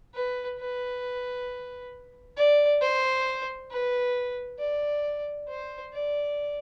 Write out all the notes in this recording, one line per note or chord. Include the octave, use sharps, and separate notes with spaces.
B4
B4
D5
C5
B4
D5
C5
D5